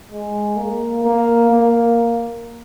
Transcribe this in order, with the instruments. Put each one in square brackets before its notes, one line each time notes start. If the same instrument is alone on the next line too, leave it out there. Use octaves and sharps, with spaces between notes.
[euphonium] G#3
A#3
A#3
A#3